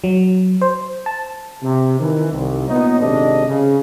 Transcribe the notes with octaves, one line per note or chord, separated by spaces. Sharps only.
F#3
C5
A5
C3
D#3 E3
C2
A#2 B3 D#4 C#5 D#5
G#1 C3 D4 A4 D#5
C#3